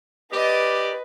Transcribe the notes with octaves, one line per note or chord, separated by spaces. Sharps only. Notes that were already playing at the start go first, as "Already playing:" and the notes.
G4 B4 D5 D#5